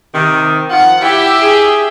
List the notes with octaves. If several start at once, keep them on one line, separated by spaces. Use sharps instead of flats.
C3 D#3
D#3 F3 F4 F#5
E4 G4 E5 G5
G#4